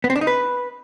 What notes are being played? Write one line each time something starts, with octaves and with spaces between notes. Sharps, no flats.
B3
C4
D4
D#4
B4